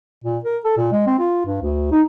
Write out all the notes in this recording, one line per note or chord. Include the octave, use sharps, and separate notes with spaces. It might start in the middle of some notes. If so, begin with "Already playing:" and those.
A#2
A#4
A4
A#2
G#3
C4
F4
G2
D2
D#4